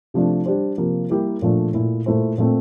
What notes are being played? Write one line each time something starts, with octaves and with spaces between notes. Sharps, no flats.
C3 F3 A3 D4
G3 D4 G4 C5
C3 F3 A#3
G3 A#3 E4 G4 A#4
A#2 F3 A3 D4
A#2 A3 E4
A#2 A3 E4 A4 C5
A#2 A3 C4